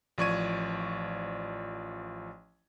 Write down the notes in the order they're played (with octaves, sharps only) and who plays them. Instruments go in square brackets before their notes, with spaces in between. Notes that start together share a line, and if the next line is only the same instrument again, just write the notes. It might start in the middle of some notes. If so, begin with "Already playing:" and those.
[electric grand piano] A1 F3 D5 C#6 G#6 D#7